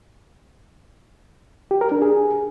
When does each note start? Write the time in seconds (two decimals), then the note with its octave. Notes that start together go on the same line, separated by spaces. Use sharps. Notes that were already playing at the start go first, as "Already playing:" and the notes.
1.71 G4
1.81 A#4
1.92 D4
2.02 G#4